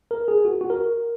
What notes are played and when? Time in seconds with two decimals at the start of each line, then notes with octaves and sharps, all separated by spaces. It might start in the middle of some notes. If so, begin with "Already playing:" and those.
0.11 A#4
0.28 G#4
0.45 F#4
0.61 F#4
0.70 A#4